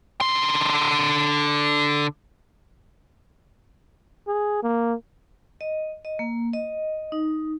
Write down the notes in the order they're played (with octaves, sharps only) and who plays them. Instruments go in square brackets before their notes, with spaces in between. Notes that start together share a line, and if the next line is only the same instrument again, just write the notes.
[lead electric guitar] D3 C6
[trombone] G#4
A#3
[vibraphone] D#5
D#5
A#3
D#5
D#4